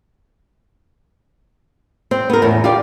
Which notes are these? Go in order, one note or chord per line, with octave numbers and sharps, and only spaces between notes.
C4
B3 A#4
E2 A2
F4 G4 D5